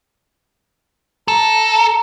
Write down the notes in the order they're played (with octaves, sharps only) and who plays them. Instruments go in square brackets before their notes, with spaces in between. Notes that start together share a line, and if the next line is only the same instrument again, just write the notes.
[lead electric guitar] A4 [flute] A#5